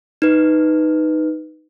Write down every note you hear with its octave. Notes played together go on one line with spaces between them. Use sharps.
D#4 B4